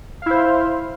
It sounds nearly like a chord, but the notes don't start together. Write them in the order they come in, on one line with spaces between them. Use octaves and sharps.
F5 E4 C5